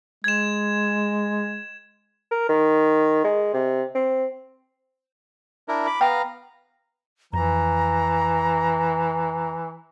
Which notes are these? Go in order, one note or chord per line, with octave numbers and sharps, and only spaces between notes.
G#3 G#6 E7
A#4
D#3
G#3
C3
C4
D4 E4 A#4
B5 D6
B3 F5 G5 A#5
F2 E3 A#5